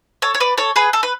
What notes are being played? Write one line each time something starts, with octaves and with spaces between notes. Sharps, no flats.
A4 C#5
C#5
B4 D5
A4 C#5
G#4 B4
A4
B4